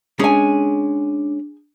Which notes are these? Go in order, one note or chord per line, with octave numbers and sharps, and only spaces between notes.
G#3 C#4 D4 G#4 G#5